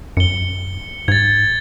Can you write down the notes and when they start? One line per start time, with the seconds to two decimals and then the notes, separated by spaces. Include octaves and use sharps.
0.17 F#2 C#7 G7
1.08 G#2 G#6 A6